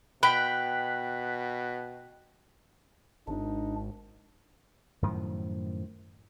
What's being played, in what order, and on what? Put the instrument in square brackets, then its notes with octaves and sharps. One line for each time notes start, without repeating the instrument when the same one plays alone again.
[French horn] B2 [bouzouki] G5 [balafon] B5 [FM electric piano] F#6 B6
[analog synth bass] G#1 [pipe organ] D4 [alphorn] D#4
[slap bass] F#2 A2 D#3 F3